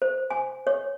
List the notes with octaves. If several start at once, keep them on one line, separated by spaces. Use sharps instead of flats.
C5
G#5
C#5